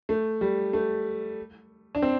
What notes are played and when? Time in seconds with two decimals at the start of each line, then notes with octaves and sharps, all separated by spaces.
0.09 A3
0.41 G3
0.73 A3
1.95 D4
2.02 C4